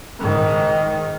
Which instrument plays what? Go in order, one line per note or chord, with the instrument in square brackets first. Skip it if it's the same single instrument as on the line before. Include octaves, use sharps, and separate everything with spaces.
[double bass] G#2 D#3